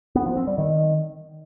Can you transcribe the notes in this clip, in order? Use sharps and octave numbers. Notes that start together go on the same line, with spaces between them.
B3
F3
C4
G3
D#3